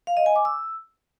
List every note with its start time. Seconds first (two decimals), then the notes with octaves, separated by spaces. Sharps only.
0.07 F5
0.17 D#5
0.26 G#5
0.36 D6
0.45 E6